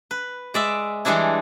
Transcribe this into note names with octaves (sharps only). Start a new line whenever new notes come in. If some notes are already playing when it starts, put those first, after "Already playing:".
B4
G#3 D5 E5
E3 G3 G#3 D4 E4